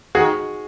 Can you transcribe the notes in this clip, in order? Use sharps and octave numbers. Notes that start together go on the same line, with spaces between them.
D#3 F#4 G#4